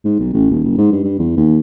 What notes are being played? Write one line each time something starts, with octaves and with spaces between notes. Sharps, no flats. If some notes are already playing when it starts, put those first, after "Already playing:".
G#2
B1
A1
D#1
F#1
G#2
G2
G2
E2
D#2